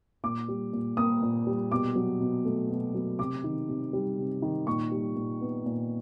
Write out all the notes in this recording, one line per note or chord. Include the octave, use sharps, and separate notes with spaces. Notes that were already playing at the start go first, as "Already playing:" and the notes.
A#2 D6
G3
A#2
A#3 D#6
A#2
G3
B2 D6
F#3
B2
A3
B2
F#3
C3 D6
D#3
C3
G3
C3
D#3
A#2 C#6
G3
A#2
B3
A#2